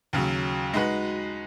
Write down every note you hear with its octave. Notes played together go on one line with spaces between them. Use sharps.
D#2 C#3 F#3
G#3 D#4 F#4 B4